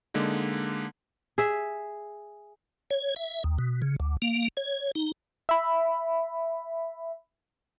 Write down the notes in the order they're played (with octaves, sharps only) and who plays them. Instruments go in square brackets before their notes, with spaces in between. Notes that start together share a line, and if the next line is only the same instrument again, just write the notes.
[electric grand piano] D3 G#3 A#3 D#4
[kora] G#4 E5
[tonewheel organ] C#5
E5
D#2
B2
C#3
D2
A#3
C#5
D#4
[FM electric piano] E5 B5